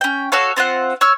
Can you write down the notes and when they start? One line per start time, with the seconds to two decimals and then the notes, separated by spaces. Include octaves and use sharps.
0.01 C#4 G5
0.32 F#4 A4 C#5 F5
0.56 C4 F4 C5 F#5
1.01 C#5 C#6 E6 F6